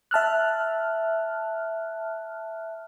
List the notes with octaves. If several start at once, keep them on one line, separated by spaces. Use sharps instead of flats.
E5 A5 F6 F#6